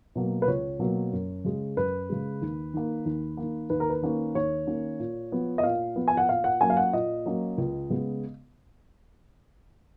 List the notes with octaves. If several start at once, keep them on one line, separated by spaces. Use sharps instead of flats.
B2 F#3 A#3
B4
C#2 C#5
B2 F#3 A#3
F#2
C#3 G#3
F#2 B4
C#3 G#3
D#2
D#3 A#3
D#2
D#3 A#3
D#2 B4
A#4
B4
D#3 A#3 C#4
D#2 C#5
D#3 A#3 C#4
A#2
F3 B3
D#5
A#2 F5
F3 B3
G#5
F#5
A#2 F5
F#5
F#3 A#3 C#4 G#5
F5
F#5
A#2 D#5
F#3 A#3 C#4
C#2
C#3 G#3 B3